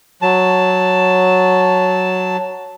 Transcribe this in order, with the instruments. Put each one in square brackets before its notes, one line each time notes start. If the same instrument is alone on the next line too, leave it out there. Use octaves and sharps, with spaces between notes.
[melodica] F#3 A5